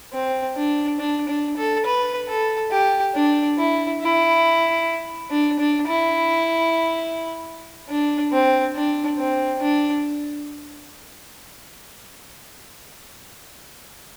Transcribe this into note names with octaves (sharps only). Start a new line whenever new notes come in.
C4
D4
D4
D4
A4
B4
A4
G4
D4
E4
E4
D4
D4
E4
D4
C4
D4
C4
D4